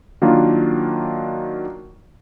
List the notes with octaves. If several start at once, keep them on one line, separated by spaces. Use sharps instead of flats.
D#3 F#3 A#3 D4 F4